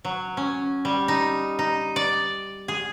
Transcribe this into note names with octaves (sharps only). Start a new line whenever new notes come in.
F#3
C#4
G3
D#4
D#4
D5
G#4